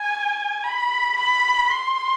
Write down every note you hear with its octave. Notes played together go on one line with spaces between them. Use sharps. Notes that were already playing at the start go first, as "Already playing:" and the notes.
Already playing: G#5
B5
B5
C6